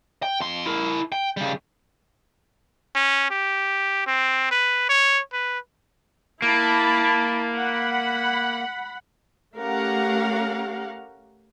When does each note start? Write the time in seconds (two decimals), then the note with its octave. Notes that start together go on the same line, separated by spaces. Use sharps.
0.23 G5
0.40 F2 C6
0.66 E4 A#4
1.12 G5
1.37 C#3 G3
2.95 C#4
3.30 G4
4.07 C4
4.51 B4
4.89 C#5
5.33 B4
6.42 A#3 E4 A5 B5
7.55 F#5 B5
9.56 A3 C#4 G4 A#4 F5 F#5